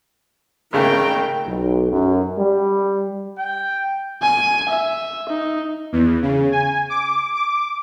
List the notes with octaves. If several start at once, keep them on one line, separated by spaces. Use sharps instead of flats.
G#1 C#3 A3 A#4 G5
B1
F#2
G3
G5
G#5
E5
D#4
E2
C#3
G#5
D6
D6